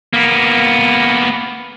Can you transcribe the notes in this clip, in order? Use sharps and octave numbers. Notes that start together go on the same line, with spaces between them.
A#3 B3